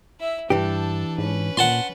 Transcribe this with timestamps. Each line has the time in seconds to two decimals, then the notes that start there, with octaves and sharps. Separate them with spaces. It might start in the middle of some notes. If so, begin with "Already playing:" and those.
0.20 E4 E5
0.50 G2 E3 D4 G4 A4
1.18 G#2 C#4 B4
1.57 A#2 F#5 A5 C6